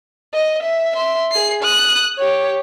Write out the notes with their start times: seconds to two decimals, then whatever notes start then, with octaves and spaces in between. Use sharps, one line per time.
0.34 D#5
0.63 E5
0.95 E5 C6
1.32 G#4 C7
1.63 D#6 F#6
2.18 G4 C#5